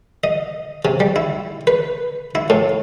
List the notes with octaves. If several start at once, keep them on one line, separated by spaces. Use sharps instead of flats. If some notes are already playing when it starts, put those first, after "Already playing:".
D#5
C3
G3
E4
B4
E4
A2